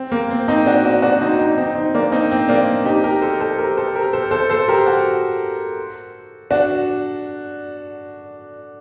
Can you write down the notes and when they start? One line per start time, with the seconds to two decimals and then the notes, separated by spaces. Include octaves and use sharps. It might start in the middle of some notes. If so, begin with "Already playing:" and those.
Already playing: C4
0.12 A#3
0.31 C4
0.48 C4 D#4
0.66 D4 F#4
0.85 D4 F#4
1.02 D4 F#4
1.21 C4 D#4
1.39 C4 D#4
1.58 C4 D#4
1.75 C4 D#4
1.95 A#3 D4
2.12 C4 D#4
2.31 C4
2.49 A#3 D4
2.85 D#4 G4
3.04 G4 A#4
3.21 A4 C5
3.40 A4 C5
3.58 G4 A#4
3.77 A4 C5
3.95 G4 A#4
4.13 A4 C5
4.31 A4 C5
4.50 A4 C5
4.68 G4 A#4
4.86 F#4 A4
6.51 D4 F#4